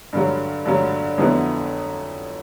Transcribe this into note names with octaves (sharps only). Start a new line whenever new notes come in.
G2 D3 F#3
G2 D3 F#3
F2 D3 F#3 B3 E4